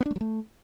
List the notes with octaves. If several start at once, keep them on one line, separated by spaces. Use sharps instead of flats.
B3
D4
A3
F#3
A3